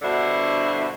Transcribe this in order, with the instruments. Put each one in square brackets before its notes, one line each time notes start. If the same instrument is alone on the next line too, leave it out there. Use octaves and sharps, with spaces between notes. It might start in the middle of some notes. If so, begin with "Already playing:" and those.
[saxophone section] G2 B2 D3 E4 F#4 C5